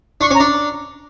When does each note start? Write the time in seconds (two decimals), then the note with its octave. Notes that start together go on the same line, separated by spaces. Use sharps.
0.21 D4 C#6
0.31 C#4 A#5
0.40 D4